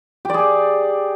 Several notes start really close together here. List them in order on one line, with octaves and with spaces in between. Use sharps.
G4 D5 G#4